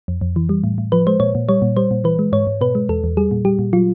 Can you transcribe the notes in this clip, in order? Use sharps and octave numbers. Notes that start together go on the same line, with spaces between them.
F2
F2
E3
G3
A2
A2
F3 B4
G#3 C5
A#2 C#5
A#2
G3 C#5
A#2
G3 C5
A#2
E3 B4
G#3
G#2 C#5
G#2
B2 B4
G#3
E2 A4
E2
G3 G#4
A#2
G3 G4
A#2
F#3 F4